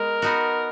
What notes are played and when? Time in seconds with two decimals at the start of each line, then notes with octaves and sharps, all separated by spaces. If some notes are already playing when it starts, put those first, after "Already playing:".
Already playing: G#3 B3 A#4
0.22 B3 D#4 F#4